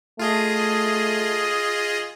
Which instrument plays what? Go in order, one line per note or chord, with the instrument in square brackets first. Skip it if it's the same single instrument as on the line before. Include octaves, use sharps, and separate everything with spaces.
[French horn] A3 [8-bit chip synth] F4 G#4 D#5